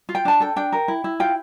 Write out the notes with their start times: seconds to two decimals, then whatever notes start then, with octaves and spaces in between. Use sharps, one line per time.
0.09 F4
0.15 G5
0.25 D4 A5
0.40 A4 G5
0.56 D4 G5
0.73 A#4
0.88 E4
1.04 E4
1.20 F4 G5